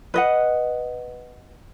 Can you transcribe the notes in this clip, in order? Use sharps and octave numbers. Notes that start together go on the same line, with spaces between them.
B4 D#5 F#5